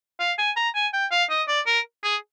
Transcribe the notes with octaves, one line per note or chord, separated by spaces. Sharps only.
F5
G#5
A#5
G#5
G5
F5
D#5
D5
A#4
G#4